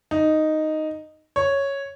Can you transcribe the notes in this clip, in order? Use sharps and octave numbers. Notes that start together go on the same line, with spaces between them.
D#4
C#5